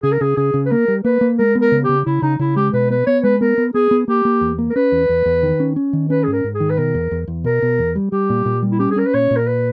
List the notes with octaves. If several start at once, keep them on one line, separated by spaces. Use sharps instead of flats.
C#3 G#4
A#4
C#3 G#4
C#3 G#4
C#3
B4
A#3 A#4
G3
A#3 B4
A#3
G#3 A#4
B3
A#4
C#3
C#3 G4
C#3 E4
C#3 D#4
C#3 E4
G#3 G4
B2 B4
B3 B4
B3 C#5
G#3 B4
B3 A#4
B3
B3 G#4
B3
A#3 G4
A#3
E2
A#3
A#4
C#4 B4
E2
E2
E2
D#3
C#4
C#4
D#3
C#4 B4
G#4
G#2
A#4
G#2
G#4
D#3
B4
B2 A#4
E2
E2
E2
B2 A#4
B2
E2
G3
G3 G4
A#2
A#2
G3
E4
C#4 G4
G#4
C#4 A#4
B4
A#2 C#5
A#2
A#4
B4